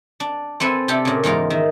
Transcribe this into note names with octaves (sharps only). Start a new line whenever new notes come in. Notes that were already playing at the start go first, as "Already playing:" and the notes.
D4
C4 A4 B4 G#5
C3 D4 G4 A4
A#2 C#3
E2 G#2 F4 A#4
D#3 E5